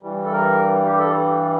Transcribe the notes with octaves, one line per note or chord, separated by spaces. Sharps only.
G2 E3 G3
A4
A#4
G4
A4